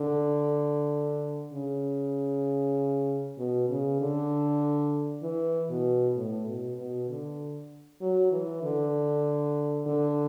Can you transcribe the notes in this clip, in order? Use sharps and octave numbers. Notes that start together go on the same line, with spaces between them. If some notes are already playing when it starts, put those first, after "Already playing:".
Already playing: D3
C#3
B2
C#3
D3
E3
B2
A2
B2
B2
D3
F#3
E3
D3
D3